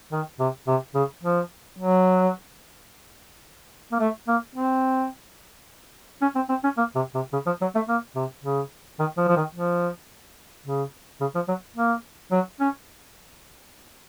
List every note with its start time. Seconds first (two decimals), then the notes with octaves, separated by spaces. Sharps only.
0.12 D#3
0.39 C3
0.67 C3
0.94 C#3
1.23 F3
1.79 F#3
3.92 A#3
3.99 A3
4.28 A#3
4.55 C4
6.21 C#4
6.35 C4
6.49 C4
6.63 C#4
6.77 A#3
6.95 C3
7.14 C3
7.32 C#3
7.46 F3
7.61 F#3
7.75 A3
7.88 A#3
8.15 C3
8.43 C#3
8.99 D#3
9.17 F3
9.28 F3
9.37 D#3
9.55 F3
10.66 C#3
11.20 C#3
11.35 F3
11.48 F#3
11.76 A#3
12.31 F#3
12.60 C#4